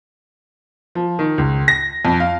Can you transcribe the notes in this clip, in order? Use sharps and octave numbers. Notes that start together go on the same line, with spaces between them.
F3
D#3
C#2
A#6
F2
F5